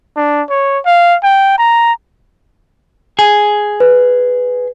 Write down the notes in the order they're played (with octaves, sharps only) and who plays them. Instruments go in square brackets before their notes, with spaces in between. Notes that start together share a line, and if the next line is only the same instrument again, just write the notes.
[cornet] D4
C#5
F5
G5
A#5
[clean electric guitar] G#4
[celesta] B4